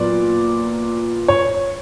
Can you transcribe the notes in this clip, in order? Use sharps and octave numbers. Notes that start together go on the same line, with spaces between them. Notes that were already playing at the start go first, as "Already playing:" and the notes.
Already playing: A#2 F#3 B3 D5
C#5